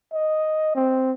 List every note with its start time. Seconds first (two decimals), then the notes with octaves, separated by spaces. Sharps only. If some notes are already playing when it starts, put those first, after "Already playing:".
0.13 D#5
0.75 C4